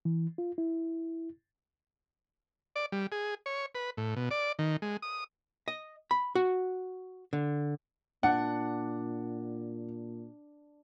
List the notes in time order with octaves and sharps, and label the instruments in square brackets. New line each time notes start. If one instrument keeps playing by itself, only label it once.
[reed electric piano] E3
F4
E4
[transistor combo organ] D5
G3
G#4
C#5
B4
A2
B2
D5
D#3
G#3
D#6
[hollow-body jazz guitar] D#5
B5
F#4
D3
[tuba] A#2 [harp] D4 [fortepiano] F#5